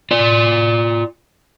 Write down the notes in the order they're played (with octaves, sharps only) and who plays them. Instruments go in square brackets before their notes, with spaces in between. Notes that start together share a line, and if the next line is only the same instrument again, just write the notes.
[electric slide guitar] F4 D5